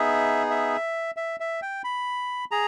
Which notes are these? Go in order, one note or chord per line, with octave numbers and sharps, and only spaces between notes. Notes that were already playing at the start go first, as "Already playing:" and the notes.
Already playing: B3 D#4 G#4 E5
E5
E5
E5
G5
B5
G#4 A#5